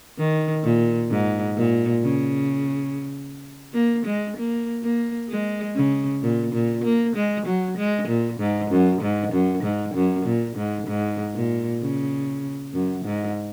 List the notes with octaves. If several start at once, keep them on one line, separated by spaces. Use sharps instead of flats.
D#3
A#2
G#2
A#2
C#3
A#3
G#3
A#3
A#3
G#3
C#3
A#2
A#2
A#3
G#3
F#3
G#3
A#2
G#2
F#2
G#2
F#2
G#2
F#2
A#2
G#2
G#2
A#2
C#3
F#2
G#2